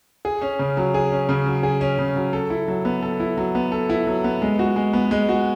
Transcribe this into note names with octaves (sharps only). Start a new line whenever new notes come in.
G#4
C#4
C#3
F#3
G#4
C#4
C#3
F#3
G#4
C#4
C#3
F#3
A4
E4
F#3
B3
A4
E4
F#3
B3
A4
E4
F#3
B3
G#3
F#4
G#3
B3
G#3
F#4